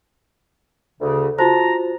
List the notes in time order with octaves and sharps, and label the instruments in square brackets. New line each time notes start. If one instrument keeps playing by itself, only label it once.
[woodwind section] D2 C#3
[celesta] F4 F#4 C5 [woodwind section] A5 A#5